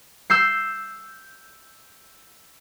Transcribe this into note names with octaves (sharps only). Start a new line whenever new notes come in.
E6 G6 C7